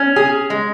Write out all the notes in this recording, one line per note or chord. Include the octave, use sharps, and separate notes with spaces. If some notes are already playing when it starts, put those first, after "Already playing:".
Already playing: C#4
G#4
G#3